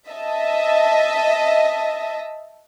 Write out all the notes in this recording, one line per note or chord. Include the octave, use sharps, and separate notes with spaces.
D#5 E5 A5